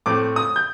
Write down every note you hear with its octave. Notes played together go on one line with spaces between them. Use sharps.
A2 A3 C4 D6
D#6
G6